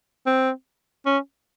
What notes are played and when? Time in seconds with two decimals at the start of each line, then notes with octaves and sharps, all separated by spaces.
0.26 C4
1.06 C#4